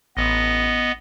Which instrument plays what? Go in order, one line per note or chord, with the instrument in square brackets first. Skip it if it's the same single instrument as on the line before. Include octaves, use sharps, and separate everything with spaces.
[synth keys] A1 [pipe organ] B3 D#5